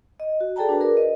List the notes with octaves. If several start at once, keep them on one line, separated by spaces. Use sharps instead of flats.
D#5
F#4
G#4 A4 D5 G5 A5 A#5
D4 F#4 B4
G#4 A#4 B4 D5
D#5